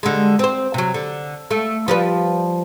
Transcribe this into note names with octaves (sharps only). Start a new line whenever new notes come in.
D3 G3 G#3
C4 C5
C3 F#3
D3
A3
F3 G3 B4